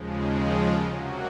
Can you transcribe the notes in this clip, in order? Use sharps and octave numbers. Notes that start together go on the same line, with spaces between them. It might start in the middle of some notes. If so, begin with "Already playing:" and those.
Already playing: D#2 C#3 F3 G#3
F4
C3 F#3 A#3 F#4